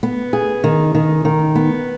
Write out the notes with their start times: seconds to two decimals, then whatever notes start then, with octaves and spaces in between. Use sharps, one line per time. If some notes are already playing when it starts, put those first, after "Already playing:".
0.03 B3
0.33 G#4
0.64 D#3
0.95 D#3
1.25 D#3
1.55 B3